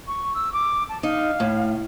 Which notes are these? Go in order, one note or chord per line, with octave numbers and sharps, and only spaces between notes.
C#6
E6
D6
A5
D#4 F5
A2